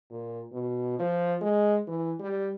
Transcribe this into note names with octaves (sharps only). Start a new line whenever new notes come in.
A#2
B2
F3
G#3
E3
G3